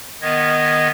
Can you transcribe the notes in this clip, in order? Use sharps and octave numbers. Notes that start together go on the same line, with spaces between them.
D#3 B3 D#5 G#6